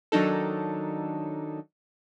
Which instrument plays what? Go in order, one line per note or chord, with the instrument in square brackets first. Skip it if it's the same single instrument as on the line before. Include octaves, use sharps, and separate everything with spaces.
[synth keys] D#3 F#3 D4 D#4 A4